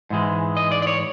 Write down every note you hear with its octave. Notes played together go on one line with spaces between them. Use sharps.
G#2 E3 G#3
D#5
D5
D5
C#5